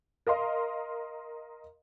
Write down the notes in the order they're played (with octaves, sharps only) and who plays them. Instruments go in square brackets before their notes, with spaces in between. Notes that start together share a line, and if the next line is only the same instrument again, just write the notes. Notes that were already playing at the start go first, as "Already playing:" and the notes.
[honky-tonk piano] A#4 D#5 F5 C6